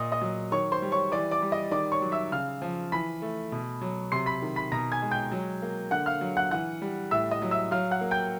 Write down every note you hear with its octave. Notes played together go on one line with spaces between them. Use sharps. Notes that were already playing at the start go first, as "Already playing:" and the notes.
Already playing: A#2 D#5 D#6
D#5 D#6
F#3
D#3 C#5 C#6
C5 C6
G3
C#5 C#6
E3 D5 D6
D5 D6
G3
D#5 D#6
D#3 D5 D6
C#5 C#6
F#3
E5 E6
C#3 F5 F6
F3
E3 B5 B6
A3
B2
F#3
C3 C6 C7
B5 B6
D#3
B5 B6
B2 A#5 A#6
G#5 G#6
G#3
G5 G6
F#3
A#3
D3 F#5 F#6
F5 F6
F#3
F#5 F#6
E3 F#5 F#6
G3
A2 E5 E6
D#5 D#6
F#3
E5 E6
F#3 F5 F6
F#5 F#6
A#3
G5 G6